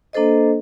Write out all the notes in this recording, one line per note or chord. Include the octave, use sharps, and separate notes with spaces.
A#3 D4 A4 C5 D#5